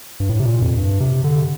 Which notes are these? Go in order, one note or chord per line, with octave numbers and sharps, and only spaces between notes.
G2
A2
C3
A#2
F2
G2
C3
D3